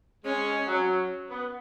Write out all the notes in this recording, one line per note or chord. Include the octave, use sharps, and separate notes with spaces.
G#3 C#4
F#3
B3